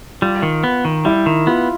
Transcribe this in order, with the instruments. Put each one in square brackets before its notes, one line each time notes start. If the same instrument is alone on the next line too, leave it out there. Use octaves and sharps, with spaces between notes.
[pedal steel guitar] G3 [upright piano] F4
[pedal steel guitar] D#3
B3
D#3
[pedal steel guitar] G3 [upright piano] E4
[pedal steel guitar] D#3
[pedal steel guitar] B3 [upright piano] F4